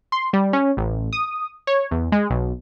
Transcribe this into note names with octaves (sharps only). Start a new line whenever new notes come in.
C6
G3
C#4
A1
D#6
C#5
E2
G#3
B1